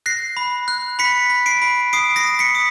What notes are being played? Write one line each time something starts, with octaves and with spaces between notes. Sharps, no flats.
F#6 A#6 C7
B5
F#6
B5 B6 C#7
B5
C7 D7
B5
D#6 C7 D7
A#6 C7
D#6
B6 C#7
D#6